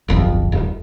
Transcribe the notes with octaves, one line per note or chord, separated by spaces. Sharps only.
D1 G1 F2
D#1